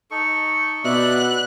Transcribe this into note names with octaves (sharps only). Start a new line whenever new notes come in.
D#4 A4 C#6
B2 B3 D5 E5 F#6